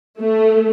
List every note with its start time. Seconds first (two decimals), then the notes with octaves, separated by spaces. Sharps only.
0.20 A3